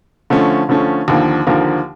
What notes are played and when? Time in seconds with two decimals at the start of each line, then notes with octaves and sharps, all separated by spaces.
0.30 D3 F3 A3 C#4
0.69 D3 F3 A3 C#4
1.08 D#2 D3 F3 A#3
1.47 D#2 D3 F3 A#3